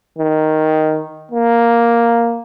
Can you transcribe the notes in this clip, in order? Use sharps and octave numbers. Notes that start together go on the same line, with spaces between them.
D#3
A#3